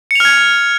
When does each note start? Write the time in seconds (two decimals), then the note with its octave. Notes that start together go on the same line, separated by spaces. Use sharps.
0.11 C#7
0.15 F7
0.20 F6
0.25 G#6